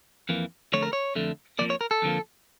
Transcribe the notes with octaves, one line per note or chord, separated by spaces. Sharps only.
F2 E3 A#3
F2 D3 A3 C#5
A#4
C#5
F2 D3 A3
F2 D3 F3 A#3 D5
C#5
A#4
A4
F2 D3 F3 A#3